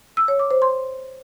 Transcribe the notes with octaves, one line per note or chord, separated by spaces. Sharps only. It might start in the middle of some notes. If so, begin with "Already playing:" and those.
E6
C#5
D6
C5
C6